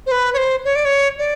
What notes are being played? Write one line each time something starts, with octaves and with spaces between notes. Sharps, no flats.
C5
B4
C#5
C5
C#5
D5
C#5
D5